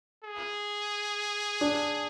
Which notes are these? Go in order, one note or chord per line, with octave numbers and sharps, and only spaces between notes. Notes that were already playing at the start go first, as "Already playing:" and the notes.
G#4
D4